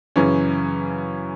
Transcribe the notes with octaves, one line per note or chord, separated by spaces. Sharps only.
F#2 C#3 E3 C#4